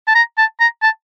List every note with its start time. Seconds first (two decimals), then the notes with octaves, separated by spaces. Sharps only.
0.07 A5
0.15 A#5
0.38 A5
0.60 A#5
0.82 A5